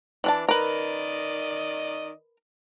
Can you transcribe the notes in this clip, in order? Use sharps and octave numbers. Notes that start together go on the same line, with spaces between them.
E3 D4 A5
D#3 A#4 B4 D5 D#5